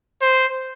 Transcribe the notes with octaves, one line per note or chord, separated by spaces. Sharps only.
C5